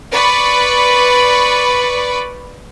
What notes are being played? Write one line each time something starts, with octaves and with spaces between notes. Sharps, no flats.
B4 D5 B5 C#6